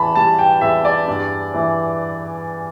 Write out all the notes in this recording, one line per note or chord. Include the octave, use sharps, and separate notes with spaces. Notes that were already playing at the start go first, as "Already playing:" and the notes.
Already playing: E2 E3 A5 B5
G3 A5
G5
E2 E5
D5
G2
E3